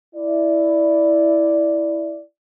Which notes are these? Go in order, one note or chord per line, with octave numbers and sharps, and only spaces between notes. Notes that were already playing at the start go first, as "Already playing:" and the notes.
E4 D5